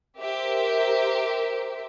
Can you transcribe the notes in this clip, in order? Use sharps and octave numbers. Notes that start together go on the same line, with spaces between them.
G4 A#4 C5 E5